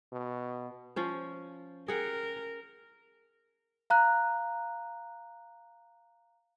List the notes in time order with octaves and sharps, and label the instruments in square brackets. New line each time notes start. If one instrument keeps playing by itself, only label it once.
[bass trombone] B2
[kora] F3 C#4 C5
[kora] G#4 F#5 G5 [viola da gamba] A#4
[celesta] F5 A#5 F#6